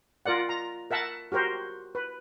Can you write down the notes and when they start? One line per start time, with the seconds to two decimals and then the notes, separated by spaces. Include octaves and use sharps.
0.26 F4 A#4 D5 F#5
0.49 A#5
0.91 A#4 E5 F#5 A5
1.32 F#4 G4 A#4 C5
1.95 B4